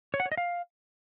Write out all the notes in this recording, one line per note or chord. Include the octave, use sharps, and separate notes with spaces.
C#5
F#5
C#5
D#5
F5